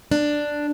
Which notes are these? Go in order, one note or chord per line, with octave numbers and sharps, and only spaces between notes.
D4